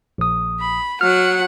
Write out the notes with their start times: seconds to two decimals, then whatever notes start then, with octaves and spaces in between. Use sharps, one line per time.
0.18 A#1 D#6
0.60 B5
1.01 F#3 F#5 F6